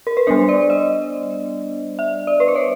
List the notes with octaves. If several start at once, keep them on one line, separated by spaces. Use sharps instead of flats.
A#4
B4
G3 B3 D4 C5
D5
D#5
E5
D5
B4
C5
C#5